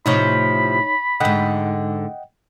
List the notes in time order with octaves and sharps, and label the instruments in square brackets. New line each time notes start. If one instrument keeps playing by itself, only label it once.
[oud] A2 C3 F3 [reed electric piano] D#4 C#5 [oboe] B5
[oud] G#2 D3 [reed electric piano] D#5 F#5 G5